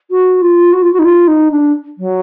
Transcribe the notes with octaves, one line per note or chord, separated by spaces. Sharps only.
F#4
F4
F#4
F4
F#4
D#4
F4
D#4
D4
F#3